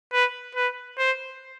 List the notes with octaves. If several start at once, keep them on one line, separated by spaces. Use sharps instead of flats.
B4
B4
C5